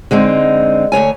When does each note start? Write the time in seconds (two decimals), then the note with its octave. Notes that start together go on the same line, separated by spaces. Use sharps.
0.11 D3 G#3 C4 D#4
0.92 D2 E3 C#5 G#5